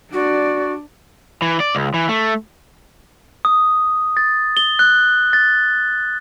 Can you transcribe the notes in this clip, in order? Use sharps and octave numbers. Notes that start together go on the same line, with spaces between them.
D4 F#4 D5
E3
D5
C#2
E3
A3
D#6
A6
G7
F#6
A6